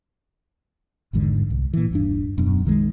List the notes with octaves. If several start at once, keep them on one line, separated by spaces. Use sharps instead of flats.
G#1 E2 G#2 D3
C2
A#2 E3
D#1 G2 D4
D#1 F#2 B2 D4
B1 D#3 F3 G#3